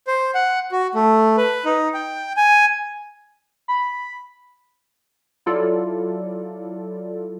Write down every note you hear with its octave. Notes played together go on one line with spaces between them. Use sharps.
C5
F#5
F#4
A3
B4
D#4
G5
G#5
B5
F#3 E4 F4 A4 D5